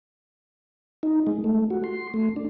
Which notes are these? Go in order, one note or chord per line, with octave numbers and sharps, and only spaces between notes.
D#4
G#3
A3
F#4
C6
A3
D4